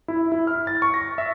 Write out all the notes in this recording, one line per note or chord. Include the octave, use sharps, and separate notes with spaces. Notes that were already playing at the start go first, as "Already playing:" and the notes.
E4
E4
F6
A6
C#6
A#6
E5